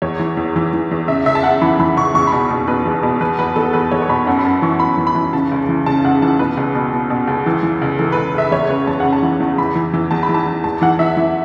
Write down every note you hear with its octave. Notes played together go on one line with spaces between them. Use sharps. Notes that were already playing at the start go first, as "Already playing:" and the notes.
E2 C#5
E3
E2
E3
E3
E2
C#3 E5
C#2 E5
A5
C#3 F#5
E3 B5
E3 B5
C#2 C#6
E2 C#6
B2 B5
B2
B2 B4
E2
B2
E2 B4
E2 B4
E2 A4
E2 B4
E2 C#5
C#6
B2 B5
F#2 F#5
B5
F#2 A5
E3 C#6
F#2 B5
E3
B5
E3
C#3 A5
C#2
E3
C#3 A5
C#2 F#5
E3 A5
B2 B4
C#2
B2
B2
B2
C#2
E3
E3
C#2
E3 A4
C#2 B4
C#2 E5
E2 C#5
C#3 B4
E2 A5
C#3 F#5
A5
E3
E2
E3 B5
E3
E3
E2 A5
B5
E3
A5
E3
E2 A5
E3 F#5
E3 E5
E3